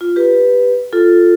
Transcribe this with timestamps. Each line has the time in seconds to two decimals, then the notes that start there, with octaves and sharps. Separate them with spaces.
0.01 F4
0.16 G4 B4
0.93 F4 A4